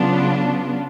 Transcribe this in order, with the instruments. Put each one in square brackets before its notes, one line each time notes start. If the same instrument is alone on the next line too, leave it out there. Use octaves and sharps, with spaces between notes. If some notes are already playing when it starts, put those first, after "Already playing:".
Already playing: [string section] C#3 F#3 B3 D4 F4